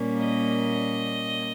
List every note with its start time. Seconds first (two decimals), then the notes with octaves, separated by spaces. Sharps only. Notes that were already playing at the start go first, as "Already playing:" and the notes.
Already playing: A#2 G3 A#3 C#4
0.20 D#5